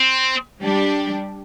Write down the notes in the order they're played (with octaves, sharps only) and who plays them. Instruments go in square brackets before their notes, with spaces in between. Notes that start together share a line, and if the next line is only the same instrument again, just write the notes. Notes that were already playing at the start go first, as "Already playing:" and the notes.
Already playing: [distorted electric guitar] C4
[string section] G3 D4 G4